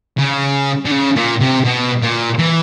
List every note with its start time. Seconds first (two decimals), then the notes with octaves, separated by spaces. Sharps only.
0.18 C#3
0.86 D3
0.91 C#3
1.16 A#2
1.41 C3
1.65 B2
2.02 A#2
2.39 E3